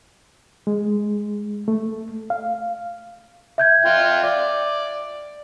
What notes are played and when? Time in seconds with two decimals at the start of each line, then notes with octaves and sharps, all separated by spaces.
0.67 G#3
1.68 A3
2.30 F5
3.58 E5 G6 G#6
3.85 F4 G5
4.24 D5